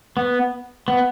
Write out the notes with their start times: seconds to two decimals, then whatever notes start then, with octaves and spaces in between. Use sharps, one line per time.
0.17 B3
0.88 B3